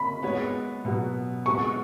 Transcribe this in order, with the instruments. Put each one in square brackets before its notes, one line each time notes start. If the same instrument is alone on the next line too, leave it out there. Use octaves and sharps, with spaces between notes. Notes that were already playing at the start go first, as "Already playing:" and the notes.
Already playing: [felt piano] B5
[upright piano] G#3 B3 F#4 C#5
B2 F#3 B3 F#4
[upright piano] G#3 B3 F#4 [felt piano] C#6